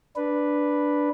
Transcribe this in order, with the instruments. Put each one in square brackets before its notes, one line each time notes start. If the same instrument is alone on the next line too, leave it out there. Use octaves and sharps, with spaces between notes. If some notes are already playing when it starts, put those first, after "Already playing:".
[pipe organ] D4 B4